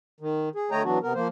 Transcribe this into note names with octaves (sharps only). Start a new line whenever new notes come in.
D#3
G#4
D3 A3 C#5 D#5 G5 A#5
E3 F#3 B3 D4 F#4
C3 B3 A#4
F3 A#3 C5